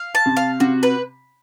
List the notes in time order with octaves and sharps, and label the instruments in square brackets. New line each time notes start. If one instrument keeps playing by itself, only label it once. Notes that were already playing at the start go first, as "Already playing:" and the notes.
Already playing: [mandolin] F5
A5
[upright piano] C3
[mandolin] F5
[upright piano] C3 [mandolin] F#4
[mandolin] B4